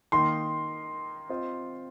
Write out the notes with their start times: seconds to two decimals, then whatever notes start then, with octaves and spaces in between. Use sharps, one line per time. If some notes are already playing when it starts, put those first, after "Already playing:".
0.12 D#3 A#3 D#4 C6
1.29 C4 F4 C5 D#5